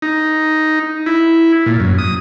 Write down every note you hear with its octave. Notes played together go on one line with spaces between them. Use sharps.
D#4
E4
A#2
F#2
D#6